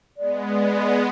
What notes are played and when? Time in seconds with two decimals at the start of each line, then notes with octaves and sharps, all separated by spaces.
0.18 G#3 B3 D5